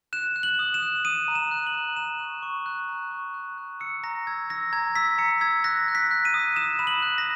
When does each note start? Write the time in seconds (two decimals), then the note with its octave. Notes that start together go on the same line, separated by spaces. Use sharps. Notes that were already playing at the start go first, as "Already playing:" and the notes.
0.13 F#6 E7
0.36 F#6
0.43 F#7
0.59 D#6
0.74 E7
0.82 F#6
1.05 D#6 D#7
1.28 A#5
1.35 E7
1.51 F#6
1.67 F#7
1.74 A#5
1.96 A#5 E7
2.20 C#6
2.42 C#6
2.66 F#6
2.89 A#5
3.11 C#6
3.34 F#6
3.58 F#6
3.80 E6 C#7
4.03 A#5 A#6
4.27 E6 G#6
4.50 E6 A#6
4.73 A#5 G#6
4.95 E6 B6
5.18 A#5 C#7
5.41 E6 G#6
5.64 F#6 A#6
5.88 F#6
5.95 B6
6.11 F#6
6.25 D#7
6.34 D#6
6.56 D#6 E7
6.79 B5 E7
6.87 F#7
7.02 F#6
7.18 A#6